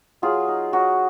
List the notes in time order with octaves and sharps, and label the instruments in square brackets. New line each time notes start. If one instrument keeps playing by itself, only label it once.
[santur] F#3 F4 G#4
D#4
F#3 F#4